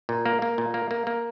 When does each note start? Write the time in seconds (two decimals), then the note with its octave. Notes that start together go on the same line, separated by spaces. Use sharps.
0.09 A#2
0.25 A#3
0.42 A#3
0.58 A#2
0.74 A#3
0.91 A#3
1.07 A#3